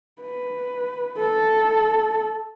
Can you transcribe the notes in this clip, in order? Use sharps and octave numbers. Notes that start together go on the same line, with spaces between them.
B4
A4